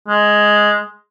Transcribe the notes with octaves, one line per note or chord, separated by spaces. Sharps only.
G#3